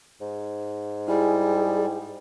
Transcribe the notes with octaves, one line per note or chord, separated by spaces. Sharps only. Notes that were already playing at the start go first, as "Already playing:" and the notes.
G#2
G3 E4 G#4 G5 G#5